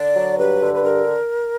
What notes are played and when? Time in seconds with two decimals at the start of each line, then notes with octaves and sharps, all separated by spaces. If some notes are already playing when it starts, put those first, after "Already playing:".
Already playing: D3 D5
0.16 F#3
0.38 G2 B4
0.60 D3
0.74 B4
0.82 G2 A#4